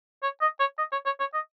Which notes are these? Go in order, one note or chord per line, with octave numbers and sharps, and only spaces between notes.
C#5
D#5
C#5
D#5
C#5
C#5
C#5
D#5